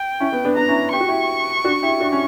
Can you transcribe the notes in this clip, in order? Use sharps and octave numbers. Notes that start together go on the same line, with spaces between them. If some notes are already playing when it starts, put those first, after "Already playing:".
Already playing: G5
C#4 E4
B3
B3 D4
B3 D4 A#5
C#4 E4
G4 C#6
F#4
E4 G4
D4 F#4
E4 G4
D4 F#4
C#4 E4